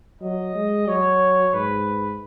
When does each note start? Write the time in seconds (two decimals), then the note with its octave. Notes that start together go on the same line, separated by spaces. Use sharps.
0.21 F#3 D#5
0.55 G#3
0.88 F#3 C#5
1.54 G#2 B4